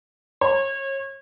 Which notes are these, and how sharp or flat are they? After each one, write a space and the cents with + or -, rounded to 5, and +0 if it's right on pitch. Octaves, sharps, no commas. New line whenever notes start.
C#5 -35